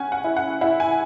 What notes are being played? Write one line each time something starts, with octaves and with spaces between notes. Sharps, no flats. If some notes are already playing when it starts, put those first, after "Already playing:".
Already playing: C#4 F#5 G#5
F#5
E4
F#5
E4 F#5
G#5